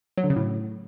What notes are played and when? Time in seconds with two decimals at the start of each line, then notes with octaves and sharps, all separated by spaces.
0.18 F#3
0.24 D3
0.30 C#3
0.36 A2